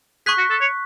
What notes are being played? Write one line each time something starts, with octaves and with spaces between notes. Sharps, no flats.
G#4 C#6 F#6 B6
F#4
A4
C#5